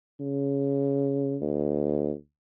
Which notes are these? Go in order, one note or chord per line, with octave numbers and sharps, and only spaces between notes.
C#3
D2